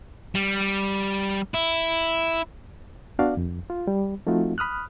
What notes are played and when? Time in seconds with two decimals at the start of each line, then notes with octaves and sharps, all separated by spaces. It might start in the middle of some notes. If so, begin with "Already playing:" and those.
0.35 G3
1.54 E4
3.19 B3 D4 F#4 D5 F5
3.37 F2
3.70 F4
3.88 G3
4.27 F3 A3 C4 D#4 F4 F#4
4.58 B5 D#6 F6 F#6